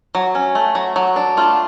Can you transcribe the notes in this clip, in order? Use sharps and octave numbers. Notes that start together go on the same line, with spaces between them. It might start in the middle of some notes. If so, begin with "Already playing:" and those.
F#3
C#4
A3
F#3
F#3
D4
A3 F4